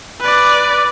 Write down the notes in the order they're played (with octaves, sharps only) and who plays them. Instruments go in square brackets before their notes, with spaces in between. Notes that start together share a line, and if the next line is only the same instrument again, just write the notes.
[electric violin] B4 D5